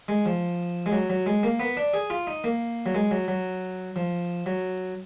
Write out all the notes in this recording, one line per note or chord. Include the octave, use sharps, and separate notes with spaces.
G#3
F3
G#3
F#3
F#3
G#3
A#3
B3
D4
G#4
F4
D#4
A#3
F#3
G#3
F#3
F#3
F3
F#3